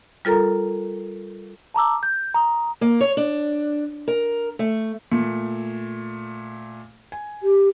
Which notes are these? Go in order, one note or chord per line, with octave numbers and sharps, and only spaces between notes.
G3 F4 A4 A#4 A#5
A5 A#5 D6 E6
G6
A#5 D#6
A#3
C#5
D4
A#4
A3
A#2 A3
G#5
G4